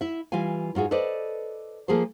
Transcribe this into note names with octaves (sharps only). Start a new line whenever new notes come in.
E4 E5
E3 G3 F4 F5 G#5
G#2 F4 F#4 G#4
A4 B4 C5 D5 D#5
F3 A#3 G#4 A4 C5